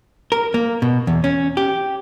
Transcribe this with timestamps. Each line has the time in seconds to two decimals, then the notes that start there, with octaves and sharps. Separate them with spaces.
0.32 A#4
0.54 A#3
0.82 B2
1.07 E2
1.24 C#4
1.57 G4